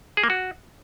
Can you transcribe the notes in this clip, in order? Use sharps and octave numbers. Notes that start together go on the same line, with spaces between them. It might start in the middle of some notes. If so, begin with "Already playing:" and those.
G#4
A#3
F#4